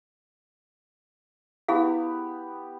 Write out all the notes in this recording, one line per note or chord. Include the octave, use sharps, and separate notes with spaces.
B3 E4 G4 G#4 F5